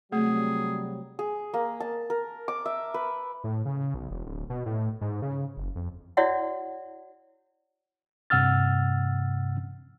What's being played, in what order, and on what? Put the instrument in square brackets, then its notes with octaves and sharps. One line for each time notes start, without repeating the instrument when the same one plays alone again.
[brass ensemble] C3 F#3 G3 [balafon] A3 [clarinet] G#4
[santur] G#4
A#3
A5
A#4
D6
E5
B4
[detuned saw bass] A2
C#3
B1
E1
D1
B2
A2
G#2
C#3
F#1
F2
[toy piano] E4 F#4 C#5 D5 E5 F#5
[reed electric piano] G2 C3 F#5 E6 F6 A6